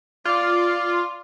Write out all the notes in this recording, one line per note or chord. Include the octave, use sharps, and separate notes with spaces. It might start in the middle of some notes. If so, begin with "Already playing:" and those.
F4 D5